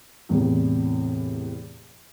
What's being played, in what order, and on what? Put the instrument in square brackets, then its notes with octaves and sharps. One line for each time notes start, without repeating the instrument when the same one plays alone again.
[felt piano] E2 A2 C3